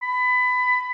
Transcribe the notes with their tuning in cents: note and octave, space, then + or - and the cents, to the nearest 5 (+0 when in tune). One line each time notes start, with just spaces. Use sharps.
B5 +20